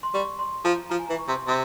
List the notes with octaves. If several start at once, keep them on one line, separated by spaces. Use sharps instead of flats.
C6
G3 C#6
C6
F3 A#5
F3 A#5
G#5
E3 A#5
C#6
C3 C6
C3